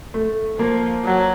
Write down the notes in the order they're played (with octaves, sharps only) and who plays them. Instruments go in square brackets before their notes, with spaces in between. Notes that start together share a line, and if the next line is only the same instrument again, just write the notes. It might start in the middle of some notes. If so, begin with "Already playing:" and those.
[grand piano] A3
[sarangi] F3 [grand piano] A#3
[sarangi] F#3